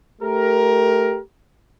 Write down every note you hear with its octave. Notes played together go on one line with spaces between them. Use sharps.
A3 G4 A#4